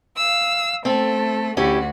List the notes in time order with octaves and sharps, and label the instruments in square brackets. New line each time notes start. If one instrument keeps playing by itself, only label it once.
[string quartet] F5 E6
[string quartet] A3 A4 [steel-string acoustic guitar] C4
[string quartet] D2 F#4 [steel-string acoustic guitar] C#4 E4 G4